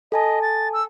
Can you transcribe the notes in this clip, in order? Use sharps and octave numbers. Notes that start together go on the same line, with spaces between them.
A4 D#5 G#5 A5
A6
E6